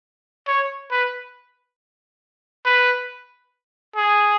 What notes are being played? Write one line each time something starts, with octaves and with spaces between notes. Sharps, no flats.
C#5
B4
B4
G#4